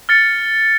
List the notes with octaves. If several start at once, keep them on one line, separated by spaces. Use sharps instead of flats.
F6 A6 C#7